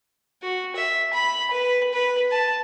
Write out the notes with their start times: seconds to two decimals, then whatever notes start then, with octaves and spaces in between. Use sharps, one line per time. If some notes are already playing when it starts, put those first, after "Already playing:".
0.42 F#4
0.76 E5
1.13 B5
1.51 B4
1.94 B4
2.31 A5